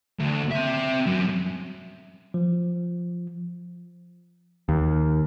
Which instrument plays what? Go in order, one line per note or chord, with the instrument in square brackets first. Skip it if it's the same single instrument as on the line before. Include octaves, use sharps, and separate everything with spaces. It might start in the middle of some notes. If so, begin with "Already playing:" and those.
[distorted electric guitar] D2
C4 E5
F#2
[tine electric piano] F3
[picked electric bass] D#2